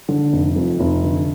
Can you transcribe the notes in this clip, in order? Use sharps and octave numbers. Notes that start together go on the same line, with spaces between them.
D3
F1
F2
F1
D3